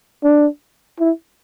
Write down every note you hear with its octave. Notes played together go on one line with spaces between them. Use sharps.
D4
E4